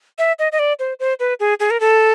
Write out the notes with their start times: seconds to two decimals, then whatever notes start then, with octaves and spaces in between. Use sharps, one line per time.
0.18 E5
0.39 D#5
0.52 D#5
0.59 D5
0.79 C5
1.00 C5
1.20 B4
1.40 G#4
1.60 G#4
1.71 A#4
1.80 A4